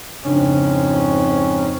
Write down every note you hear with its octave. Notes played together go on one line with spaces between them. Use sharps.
F2 G#2 C#3 C#4 D4